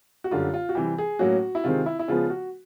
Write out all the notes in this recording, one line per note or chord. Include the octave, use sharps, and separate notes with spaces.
F#4
F#2 D3 G3 F4
F4
F#4
C3 E3 G3 G4
G#4
A2 F#3 A#3 C#4 F#4
E4
C3 D#3 G#3 C4 F4
E4
E4
C#3 F3 G#3 B3 F4
F#4